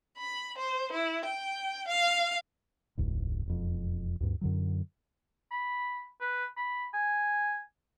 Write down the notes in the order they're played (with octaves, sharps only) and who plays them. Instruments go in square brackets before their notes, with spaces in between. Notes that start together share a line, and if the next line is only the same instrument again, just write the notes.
[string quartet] B5
C5
E4
G5
F5
[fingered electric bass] E1 C#2 G#2
E1 F2
D2 G2
F#2 D3 F#3
[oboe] B5
B4
B5
G#5